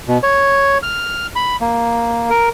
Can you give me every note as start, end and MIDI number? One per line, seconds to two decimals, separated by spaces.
0.08 0.18 47
0.23 0.78 73
0.83 1.27 89
1.36 1.56 83
1.61 2.30 58
2.30 2.49 70